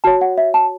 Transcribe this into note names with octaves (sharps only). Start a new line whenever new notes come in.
F#4 C#5 A5
F#5
E5
A5